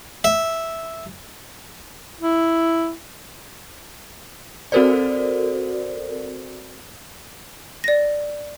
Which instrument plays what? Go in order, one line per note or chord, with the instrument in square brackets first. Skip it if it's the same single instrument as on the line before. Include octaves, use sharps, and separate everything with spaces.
[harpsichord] E5
[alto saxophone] E4
[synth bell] C4 F#4 A4 A#4 C5 D5
[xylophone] D5 A#6